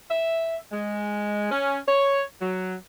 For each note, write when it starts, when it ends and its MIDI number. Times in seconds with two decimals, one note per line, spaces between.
0.10 0.56 76
0.72 1.49 56
1.51 1.78 61
1.88 2.22 73
2.42 2.75 54